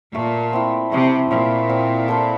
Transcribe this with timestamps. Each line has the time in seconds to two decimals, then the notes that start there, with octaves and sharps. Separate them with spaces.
0.15 A#2 A3
0.53 C4 E4
0.92 C3 A3
1.31 A#2 C4 E4
1.69 C4
2.08 E4 A4 C5